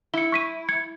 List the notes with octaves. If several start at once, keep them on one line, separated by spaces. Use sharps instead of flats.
E4 C#7 G7
C#6 B6 D#7
G#6 C#7